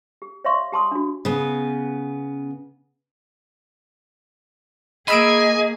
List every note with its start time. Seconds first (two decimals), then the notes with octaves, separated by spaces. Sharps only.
0.22 G4
0.44 C#5 D5 E5 F5 C6 C#6
0.72 G4 A5 C6 D#6
0.91 D4 F#4
1.25 C#3 B3
5.08 A#3 G#4 D#5 G#5 B5 E6 D7